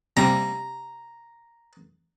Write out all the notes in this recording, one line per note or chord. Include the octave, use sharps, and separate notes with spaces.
C3 G3 A#3 C4 A#5